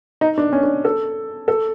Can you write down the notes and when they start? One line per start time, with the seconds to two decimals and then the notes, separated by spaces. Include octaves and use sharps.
0.21 D#4
0.38 D4
0.53 C#4
0.63 D4
0.85 A4
1.48 A4